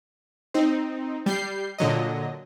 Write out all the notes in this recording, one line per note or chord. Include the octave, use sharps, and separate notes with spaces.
C4 D#4
G3 G6 C7
A#2 D3 F#3 D#5